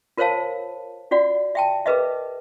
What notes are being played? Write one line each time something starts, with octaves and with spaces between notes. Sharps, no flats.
F4 A#4 C5 C#5 F5 A5
F4 F#4 D5 F#5
E5 G5 A5
G#4 A#4 B4 D#5 E5